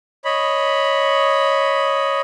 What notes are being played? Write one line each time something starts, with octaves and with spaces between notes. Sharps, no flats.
C#5 D#5 B5